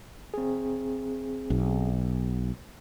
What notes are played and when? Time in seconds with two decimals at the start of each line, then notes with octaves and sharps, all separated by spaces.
0.34 C4 G#4
1.50 B1